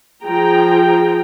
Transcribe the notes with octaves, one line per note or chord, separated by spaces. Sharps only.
F3 G#4 G5 A#5